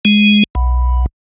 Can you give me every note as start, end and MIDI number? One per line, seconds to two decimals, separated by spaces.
0.05 0.43 56
0.55 1.06 35